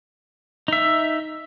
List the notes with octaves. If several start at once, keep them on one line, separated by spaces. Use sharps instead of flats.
D#4 E5